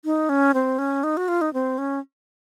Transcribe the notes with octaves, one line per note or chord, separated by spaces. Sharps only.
D#4
C#4
C4
C#4
D#4
F#4
F4
D#4
C4
C#4